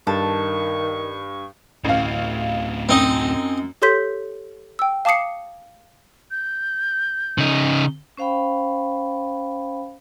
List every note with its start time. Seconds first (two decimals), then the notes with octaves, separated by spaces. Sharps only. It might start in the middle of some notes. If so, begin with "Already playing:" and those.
0.07 G2 D#3 A4 C#6
1.85 A1 D2 A2 F5
2.89 F#2 C4 D#4
3.82 G4 A4 C#5 C6 G6 B6
4.79 G5 E6
5.05 F5 A5 D6 D#6 C7 C#7
6.31 G6
7.38 C#3 D#4
8.17 C#4 C5 F5 G5 B5